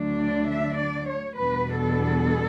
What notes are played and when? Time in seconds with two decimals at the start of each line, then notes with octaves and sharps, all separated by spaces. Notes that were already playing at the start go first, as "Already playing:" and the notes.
Already playing: D2 D3 F#3 A3 D4
0.20 D5
0.50 E5
0.79 D5
1.09 C#5
1.37 E2 B2 G3 B3 D4 B4
1.81 A4